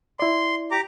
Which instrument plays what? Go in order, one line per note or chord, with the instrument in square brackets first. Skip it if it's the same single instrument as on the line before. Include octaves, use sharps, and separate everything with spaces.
[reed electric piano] E4 D5 [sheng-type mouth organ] C6
[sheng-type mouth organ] G4 A#5 D6